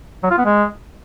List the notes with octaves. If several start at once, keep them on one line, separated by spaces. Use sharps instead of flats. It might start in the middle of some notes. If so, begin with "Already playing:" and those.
F#3
F4
B3
G#3